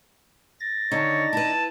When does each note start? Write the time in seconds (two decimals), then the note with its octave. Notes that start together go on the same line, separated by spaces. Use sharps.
0.60 A6 A#6
0.92 D3 D#3 D4 D#4 C#5
1.33 E4 B4 A5